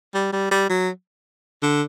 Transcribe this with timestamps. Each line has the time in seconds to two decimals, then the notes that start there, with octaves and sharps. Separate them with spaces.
0.14 G3
0.33 G3
0.51 G3
0.70 F#3
1.63 D3